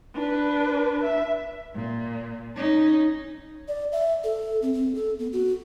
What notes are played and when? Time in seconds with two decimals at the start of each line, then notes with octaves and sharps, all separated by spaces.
0.14 D4 B4
1.04 E5
1.75 A#2
2.56 C#4 D#4
3.68 D5
3.92 E5
4.24 A4
4.62 C4
4.74 C4
4.95 A4
5.19 B3
5.33 F#4